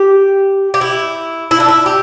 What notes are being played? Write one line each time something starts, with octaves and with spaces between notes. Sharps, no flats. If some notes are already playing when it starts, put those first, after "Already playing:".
Already playing: G4
G4
E4
E4
D4
E4
G4